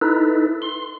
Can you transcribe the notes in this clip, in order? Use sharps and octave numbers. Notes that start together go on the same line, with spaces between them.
D#4 E4 A4 B4
C6